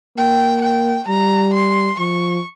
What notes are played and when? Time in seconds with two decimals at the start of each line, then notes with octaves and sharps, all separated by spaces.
0.17 A#3 G5
0.62 G5
1.08 G3 A#5
1.54 C6
1.99 F3 C#6